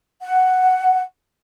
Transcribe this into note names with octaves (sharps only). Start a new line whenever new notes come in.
F#5